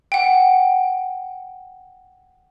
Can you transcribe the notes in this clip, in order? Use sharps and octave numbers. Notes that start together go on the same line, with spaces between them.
F#5 G5